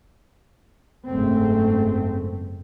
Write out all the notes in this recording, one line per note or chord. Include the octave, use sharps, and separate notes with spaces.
F#1 G#2 A3 C4